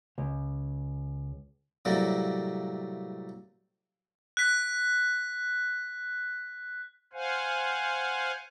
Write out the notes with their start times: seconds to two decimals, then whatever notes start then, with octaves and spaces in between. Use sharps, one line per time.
0.18 C#2
1.85 A2 C3 F#3 G3 A#3
4.37 F#6 B6
7.13 C5 F5 F#5 G#5